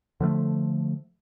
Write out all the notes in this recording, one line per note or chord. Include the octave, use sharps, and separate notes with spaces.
D3 F3 G3 A3